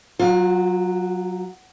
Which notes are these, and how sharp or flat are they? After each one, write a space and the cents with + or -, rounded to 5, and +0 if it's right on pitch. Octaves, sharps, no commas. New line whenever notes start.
F#3 +0 F4 +35